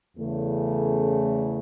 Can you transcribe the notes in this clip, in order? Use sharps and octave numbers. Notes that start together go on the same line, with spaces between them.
E2 C#3 A3